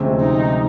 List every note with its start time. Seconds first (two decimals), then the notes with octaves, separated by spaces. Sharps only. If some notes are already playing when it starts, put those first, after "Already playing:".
Already playing: D2 C3 F3 G#3 C#4
0.20 D#4